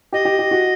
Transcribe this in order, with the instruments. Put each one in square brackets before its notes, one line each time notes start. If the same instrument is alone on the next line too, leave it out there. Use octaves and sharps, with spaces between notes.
[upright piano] G4 [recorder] D#5
[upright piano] G4
G4
F#4